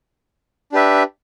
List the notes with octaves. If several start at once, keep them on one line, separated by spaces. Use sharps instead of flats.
D4 G4 B4 E5